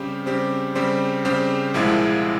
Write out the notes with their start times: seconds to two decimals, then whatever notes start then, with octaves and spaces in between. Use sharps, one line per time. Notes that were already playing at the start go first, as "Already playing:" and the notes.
Already playing: C#3 G3 C4 G4 C5
0.26 C#3 G3 C4 G4 C5
0.75 C#3 G3 C4 G4 C5
1.25 C#3 G3 C4 G4 C5
1.74 C2 A#2 F3 G#3 E4